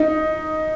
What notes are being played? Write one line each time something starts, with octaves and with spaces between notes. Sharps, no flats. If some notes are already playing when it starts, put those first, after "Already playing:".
Already playing: D#4